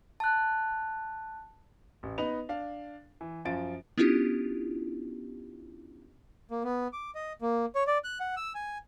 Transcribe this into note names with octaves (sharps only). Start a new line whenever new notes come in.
A5 F#6
A1
B3 D#4 B4 D#5 F7
D4 F5
E3
F#2 F3 F4 A6 D7
B3 C#4 D4 E4 F4 G4
A#3
B3
D6
D#5
A#3
C#5
D5
F#6
F#5
E6
G#5